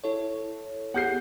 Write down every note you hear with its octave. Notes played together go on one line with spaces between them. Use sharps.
E4 A4 C#5
B3 G4 G#4 F#5 G6 C7